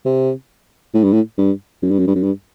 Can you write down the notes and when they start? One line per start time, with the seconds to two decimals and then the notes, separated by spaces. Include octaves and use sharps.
0.05 C3
0.94 A2
1.04 G2
1.13 A2
1.38 G2
1.82 F#2
1.91 G2
1.99 F#2
2.07 G2
2.15 F#2
2.23 G2